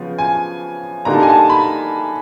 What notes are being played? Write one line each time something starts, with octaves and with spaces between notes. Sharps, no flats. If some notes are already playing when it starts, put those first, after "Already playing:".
Already playing: C#3 F3 B3
G#5
D3 G3 A#3 D#4 A#5
A5
G#5
A5
B5